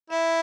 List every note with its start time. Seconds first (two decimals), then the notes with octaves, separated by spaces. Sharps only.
0.10 E4 E5